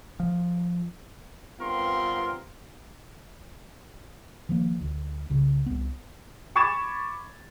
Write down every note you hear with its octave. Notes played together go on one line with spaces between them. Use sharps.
F3
G2 B3 C4 F4 A#4 C6
D#3 F3 A#3
D2
C2 C#3
C2 B3
B5 C#6 D6 G#6 A6 E7